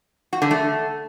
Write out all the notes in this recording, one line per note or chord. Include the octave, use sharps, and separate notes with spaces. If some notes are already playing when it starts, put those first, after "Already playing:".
F#4
D3
A3